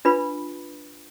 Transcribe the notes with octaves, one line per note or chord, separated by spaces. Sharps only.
D4 F4 B4 B5